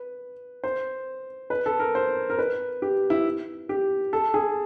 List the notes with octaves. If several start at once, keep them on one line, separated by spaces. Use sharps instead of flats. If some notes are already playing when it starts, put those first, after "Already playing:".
Already playing: B4
C5
B4
A4
A#4
C5
A#4
B4
G4
E4
G4
A4
G#4